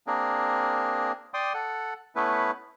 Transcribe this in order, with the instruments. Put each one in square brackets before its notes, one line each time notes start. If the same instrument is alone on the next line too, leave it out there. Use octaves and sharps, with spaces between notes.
[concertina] A#3 C4 D4 G#4 A#4
D5 G5 C6 D6 D#6
A4 F#5
A3 B3 C#4 E4 B4